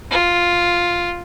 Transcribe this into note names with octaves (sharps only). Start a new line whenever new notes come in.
F4